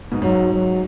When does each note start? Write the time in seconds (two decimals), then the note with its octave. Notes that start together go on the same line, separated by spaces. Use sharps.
0.12 G#2 B2
0.22 G#2 F#3
0.53 F#3